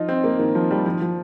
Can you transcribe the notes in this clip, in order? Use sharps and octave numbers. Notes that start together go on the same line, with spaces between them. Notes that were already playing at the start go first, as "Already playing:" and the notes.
Already playing: F3 D#4 F4
C4
A#3
D#3
F3
G3
F3
F3